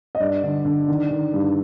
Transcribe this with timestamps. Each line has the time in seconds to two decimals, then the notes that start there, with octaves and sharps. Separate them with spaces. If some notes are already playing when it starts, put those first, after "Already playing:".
0.15 D#5
0.20 G2 D5
0.43 D3
0.65 D3
0.88 D#3
1.10 D#3
1.34 G2